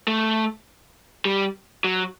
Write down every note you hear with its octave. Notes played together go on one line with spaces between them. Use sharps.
A3
G3
F#3